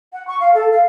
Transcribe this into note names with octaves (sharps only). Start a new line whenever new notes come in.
F#5
C#6
F5
A4
F5